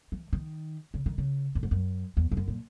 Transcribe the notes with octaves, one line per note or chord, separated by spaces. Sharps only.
E3
D#3
C#3
D#3
C#3
F#2
G#2
F#2
E2
E2
F#2
A#2